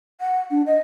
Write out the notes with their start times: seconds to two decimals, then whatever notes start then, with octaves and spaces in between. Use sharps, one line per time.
0.21 F#5
0.51 D4
0.66 D#5